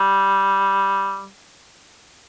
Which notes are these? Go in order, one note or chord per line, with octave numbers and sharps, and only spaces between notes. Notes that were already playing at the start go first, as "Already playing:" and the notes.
Already playing: G3